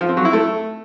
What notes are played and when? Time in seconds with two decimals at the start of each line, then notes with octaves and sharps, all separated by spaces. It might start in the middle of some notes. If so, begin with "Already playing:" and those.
0.01 F3
0.09 C4
0.17 F#3
0.25 E4
0.33 A3